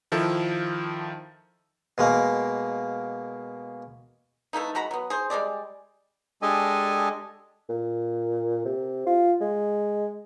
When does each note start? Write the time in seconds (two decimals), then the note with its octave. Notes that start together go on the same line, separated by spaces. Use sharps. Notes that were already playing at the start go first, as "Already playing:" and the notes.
0.12 D#3 F3 E4 A4
1.98 B2 G#3 A#3
4.53 E3 A3 A#3 D#4
4.75 G#3 F#4 A#5 B5
4.91 F#3 B3
5.10 G#4 C5
5.30 G3 G#3 G#4 D5
6.42 G#3 D4 G4 A4 D#5 G#5
7.69 A#2
8.65 C3
9.06 F4
9.41 G#3